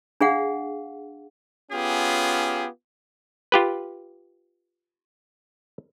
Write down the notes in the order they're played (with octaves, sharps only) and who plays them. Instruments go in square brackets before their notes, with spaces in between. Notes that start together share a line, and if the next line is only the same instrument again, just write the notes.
[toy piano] D4 G#4 F5 F#5
[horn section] B3 C#4 F4 G4 G#4
[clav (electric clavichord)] F4 G4 B4